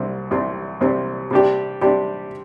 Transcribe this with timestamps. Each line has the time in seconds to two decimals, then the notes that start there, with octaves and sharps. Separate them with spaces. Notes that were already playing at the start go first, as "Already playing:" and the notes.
Already playing: C2 C3 G3 C4
0.31 C2 C3 G3 C4
0.81 C2 C3 G3 C4
1.31 C3 G3 D4 G4
1.81 C3 G3 D4 G4